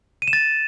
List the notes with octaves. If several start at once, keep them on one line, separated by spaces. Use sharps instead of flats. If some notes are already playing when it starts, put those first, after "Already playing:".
D#7
E7
A6